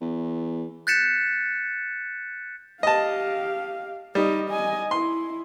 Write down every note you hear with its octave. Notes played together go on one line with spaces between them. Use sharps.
E2
F#6 G6 A6 B6 C#7 E7
G4 D#5 F5 A5
G3 D#4 D#5
D#5 G#5
E4 C6